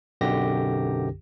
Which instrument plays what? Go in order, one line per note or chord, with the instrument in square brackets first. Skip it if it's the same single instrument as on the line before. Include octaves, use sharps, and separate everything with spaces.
[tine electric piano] B1 F#2 D3 G4 A#6